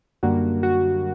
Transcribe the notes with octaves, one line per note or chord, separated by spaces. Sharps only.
F#2 D3 G3 A#3 F#4
F#4